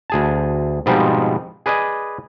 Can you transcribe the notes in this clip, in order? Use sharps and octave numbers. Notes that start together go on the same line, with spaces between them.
D2 G#4 A5
G#2 B2 F3 G3 C4 D#4
G#4 B4 D5 D#5 G#5